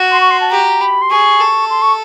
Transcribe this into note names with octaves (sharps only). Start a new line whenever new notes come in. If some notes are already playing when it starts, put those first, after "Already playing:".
Already playing: F#4
C6
C#6
C6
A5
G4 A#5
B5
C6
G#4 C#6
A4
C6
C#6